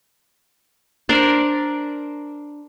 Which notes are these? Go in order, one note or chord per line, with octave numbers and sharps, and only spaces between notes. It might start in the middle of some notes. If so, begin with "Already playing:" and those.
D4 A#4 C5 D5